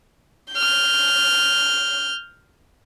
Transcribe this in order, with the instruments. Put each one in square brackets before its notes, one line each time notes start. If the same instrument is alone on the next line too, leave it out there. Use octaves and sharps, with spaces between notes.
[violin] F6 G6